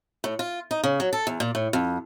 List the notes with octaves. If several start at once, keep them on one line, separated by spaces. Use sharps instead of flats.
A2
F4
D#4
C#3
F#3
A4
E2
A#2
A2
F2